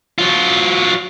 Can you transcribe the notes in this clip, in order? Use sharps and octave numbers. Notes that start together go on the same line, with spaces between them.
F#3 F4